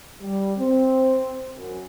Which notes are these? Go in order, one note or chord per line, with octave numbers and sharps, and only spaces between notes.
G3
C4
F#2